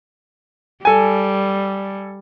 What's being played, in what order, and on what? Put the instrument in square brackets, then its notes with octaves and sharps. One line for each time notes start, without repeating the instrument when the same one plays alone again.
[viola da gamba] G3 [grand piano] A4 G#5